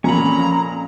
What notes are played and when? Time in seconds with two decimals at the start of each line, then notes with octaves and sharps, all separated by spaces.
0.04 F2 A#2 C#4 A#5 B5